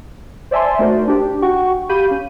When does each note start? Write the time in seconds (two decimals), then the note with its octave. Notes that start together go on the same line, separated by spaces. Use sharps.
0.51 C5 D5 E5 G#5 A5 C6
0.79 A3 D#4 F#4 A#4 C5 D5
1.08 D4 G4
1.42 F#4 F#5 G5 C#6
1.89 G4 F5 B5 G6 D#7
2.11 C#4